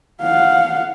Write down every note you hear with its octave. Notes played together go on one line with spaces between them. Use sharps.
F5 F#5